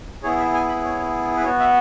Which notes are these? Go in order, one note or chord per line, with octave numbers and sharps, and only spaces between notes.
B3 E4 G#4 C#5
E5
G#5
B5
C#5
B4
B3 F#4 C#5
E5